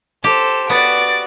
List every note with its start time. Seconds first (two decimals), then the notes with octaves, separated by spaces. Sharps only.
0.24 G4 A4 C5
0.70 B3 F#4 D5 A6 D7